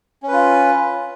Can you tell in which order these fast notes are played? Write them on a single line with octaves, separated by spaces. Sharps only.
C#4 B4 F4